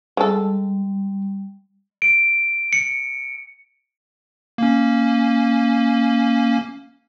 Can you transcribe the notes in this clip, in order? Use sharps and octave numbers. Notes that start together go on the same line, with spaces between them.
G3 G#3 A4
D7
C#7
A#3 C#4